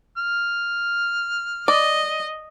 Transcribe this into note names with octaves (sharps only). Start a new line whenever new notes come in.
F6
D5 D#5